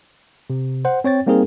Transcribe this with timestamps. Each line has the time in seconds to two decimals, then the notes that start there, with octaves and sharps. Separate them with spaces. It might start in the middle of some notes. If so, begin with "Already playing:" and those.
0.50 C3
0.85 C5 F#5
1.04 C4 C#5 G5 A6
1.26 G3 A#3 C4 D#4 G#4 A#4